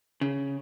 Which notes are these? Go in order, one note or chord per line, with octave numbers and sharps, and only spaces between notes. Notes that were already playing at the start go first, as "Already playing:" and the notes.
C#3